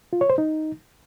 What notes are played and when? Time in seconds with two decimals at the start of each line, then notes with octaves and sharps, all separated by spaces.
0.13 F4
0.21 C#5
0.30 C5
0.38 D#4